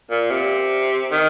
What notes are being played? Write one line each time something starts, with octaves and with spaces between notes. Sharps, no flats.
A#2
C3
D#3